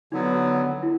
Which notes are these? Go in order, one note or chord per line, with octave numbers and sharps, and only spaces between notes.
D3 F#3 B3 D#4
E4